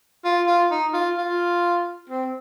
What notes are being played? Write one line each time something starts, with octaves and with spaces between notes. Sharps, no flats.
F4
F4
D#4
F4
F4
C4